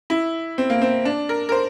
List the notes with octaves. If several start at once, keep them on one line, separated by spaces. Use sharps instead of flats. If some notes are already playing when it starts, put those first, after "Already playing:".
E4
C4
A#3
C4
D4
A#4
A#4
C5